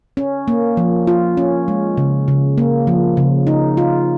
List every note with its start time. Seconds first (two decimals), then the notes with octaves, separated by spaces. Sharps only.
0.17 C#4
0.48 A#3
0.77 F3
1.07 F4
1.37 C#4
1.68 G#3
1.97 C#3
2.28 C#3
2.58 A#3
2.87 F3
3.17 C#3
3.47 D#4
3.77 F4